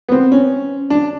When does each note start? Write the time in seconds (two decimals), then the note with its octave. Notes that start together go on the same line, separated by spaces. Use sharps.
0.09 B3
0.12 C4
0.32 C#4
0.90 D4